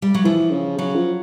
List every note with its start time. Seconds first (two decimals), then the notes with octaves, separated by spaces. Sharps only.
0.02 G3
0.14 F#3
0.25 E3 F3
0.51 C#3
0.78 C#3 F#3
0.95 F3